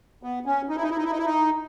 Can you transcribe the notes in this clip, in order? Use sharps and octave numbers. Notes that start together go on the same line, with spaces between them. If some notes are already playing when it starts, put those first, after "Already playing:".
B3
C#4
D#4
E4
D#4
E4
D#4
E4
D#4
E4
D#4